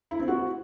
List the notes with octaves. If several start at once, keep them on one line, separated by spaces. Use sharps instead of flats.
E4
C4
F#4